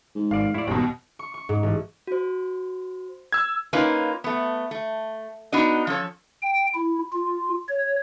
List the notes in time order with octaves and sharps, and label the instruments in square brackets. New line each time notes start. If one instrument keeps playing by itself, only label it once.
[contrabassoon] G#2
[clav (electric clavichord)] G#1 D5 [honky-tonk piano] F5
[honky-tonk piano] A2 [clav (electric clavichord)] E4 D5
[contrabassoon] D#1 [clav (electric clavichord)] G#1 [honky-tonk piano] D#2 B2
[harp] C#6
C#6
G#2
A1
[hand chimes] F#4 C5
[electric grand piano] E6 G#6
[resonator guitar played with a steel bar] A#3 C#4 D#4 F4 B4
A3 B3
A3
B3 D4 D#4 F#4 D#5
F3 C#4 A4 C#5
[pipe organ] G5
E4
F4
C#5